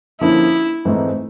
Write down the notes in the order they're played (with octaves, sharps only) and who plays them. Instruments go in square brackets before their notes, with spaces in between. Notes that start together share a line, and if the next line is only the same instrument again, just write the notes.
[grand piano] D3 F3 A#3 C#4 [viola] E4
[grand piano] G#2 E3 A3 C4 D#4